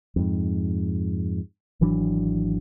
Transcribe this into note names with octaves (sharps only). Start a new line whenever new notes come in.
F2 G#2
G#1 E3 F#3 D4